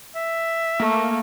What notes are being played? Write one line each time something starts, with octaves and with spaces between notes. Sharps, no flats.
E5
A3 A#3